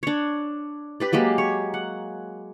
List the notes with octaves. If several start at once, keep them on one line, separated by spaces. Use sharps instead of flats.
D4 C#5
G4 B4 D5
F#3 G#3 A#3 G4
C#5
F#5